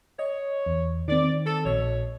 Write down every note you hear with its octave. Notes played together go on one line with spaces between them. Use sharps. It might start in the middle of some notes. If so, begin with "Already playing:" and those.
C#5 D#5
E2
D#3 C4 D5
A4
A#1 B2 C#5